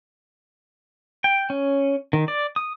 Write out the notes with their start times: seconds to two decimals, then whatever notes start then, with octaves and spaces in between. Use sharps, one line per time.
1.24 G5
1.50 C#4
2.13 D#3
2.28 D5
2.56 D#6